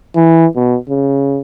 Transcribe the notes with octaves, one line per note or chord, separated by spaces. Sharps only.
E3
B2
C#3